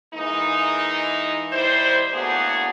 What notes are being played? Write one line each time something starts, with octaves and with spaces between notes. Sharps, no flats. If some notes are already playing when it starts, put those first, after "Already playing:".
E3 G#3 A#3 D#4
D#2 G3 E4 C5
A2 A#3 B3 D4 F#4 G#4